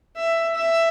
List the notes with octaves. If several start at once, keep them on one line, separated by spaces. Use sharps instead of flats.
E5
E5